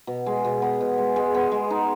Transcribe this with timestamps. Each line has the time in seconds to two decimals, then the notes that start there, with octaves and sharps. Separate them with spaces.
0.07 B2
0.26 G#3
0.44 B2
0.62 B3
0.81 B2
0.98 G#3
1.16 G#3
1.35 B3
1.52 G#3
1.70 D#4